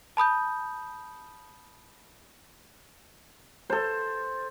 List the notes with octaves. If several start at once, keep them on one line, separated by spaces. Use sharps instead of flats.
A5 B5 D#6 G6
A4 C5